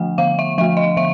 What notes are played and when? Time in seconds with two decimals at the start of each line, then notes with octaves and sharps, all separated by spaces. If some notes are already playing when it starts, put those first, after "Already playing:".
Already playing: D3 F3 A3 F#5
0.18 D3 F5
0.39 E5
0.58 F3 E5
0.61 A3
0.77 D#5
0.97 D3 E5